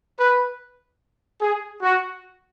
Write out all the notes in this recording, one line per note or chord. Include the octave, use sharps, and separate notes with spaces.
B4
G#4
F#4